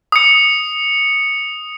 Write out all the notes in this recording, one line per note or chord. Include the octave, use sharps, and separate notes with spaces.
D#6 C#7